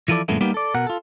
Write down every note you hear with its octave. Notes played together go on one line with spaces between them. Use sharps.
E3 F3 E4 A4 D5
F#2 A#2 D3 G#3 A3 B3
G3 A#3 B3 D#4 G4
A4 D5
B2 A#4 F#5
F4 A4